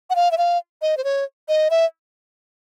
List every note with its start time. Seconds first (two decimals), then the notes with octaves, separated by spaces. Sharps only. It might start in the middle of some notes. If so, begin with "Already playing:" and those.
0.10 F#5
0.16 F5
0.31 E5
0.38 F5
0.82 D#5
0.97 C5
1.04 C#5
1.48 D#5
1.71 E5